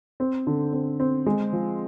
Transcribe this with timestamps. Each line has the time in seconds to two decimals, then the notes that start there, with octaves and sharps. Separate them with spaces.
0.20 C4
0.47 D3
0.73 C4
1.00 C4
1.26 G#3
1.53 F3